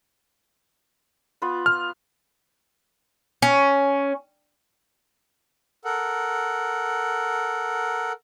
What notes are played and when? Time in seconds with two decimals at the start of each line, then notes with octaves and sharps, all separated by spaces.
1.42 B3 F4 B4
1.66 F6
3.42 C#4
5.85 A4 A#4 F#5